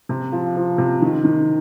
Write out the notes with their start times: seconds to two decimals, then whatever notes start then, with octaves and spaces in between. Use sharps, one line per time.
0.09 C3
0.32 F3
0.56 F3
0.78 C3
1.02 D#3
1.24 D#3